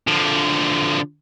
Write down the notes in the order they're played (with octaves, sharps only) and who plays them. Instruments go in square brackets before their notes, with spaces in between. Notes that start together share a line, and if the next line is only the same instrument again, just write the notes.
[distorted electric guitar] D3 F3